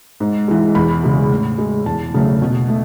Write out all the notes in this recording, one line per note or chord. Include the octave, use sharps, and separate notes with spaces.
G#2
E3 G#3
E2 B5
C#3 G#3
A2
G#3
E2 A5
C#3 F#3 A3
B2
A3